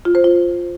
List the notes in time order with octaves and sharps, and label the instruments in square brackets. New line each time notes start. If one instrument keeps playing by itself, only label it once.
[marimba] F4
C5
F4